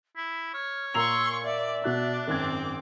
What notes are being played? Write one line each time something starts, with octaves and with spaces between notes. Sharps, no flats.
E4 B6
C#5 F6
A#2 A#5 C6 C#6 E6 F7
D5 E5
B2 D4 F#4 D5 F#6
G#1 F#2 C4 D6 G#6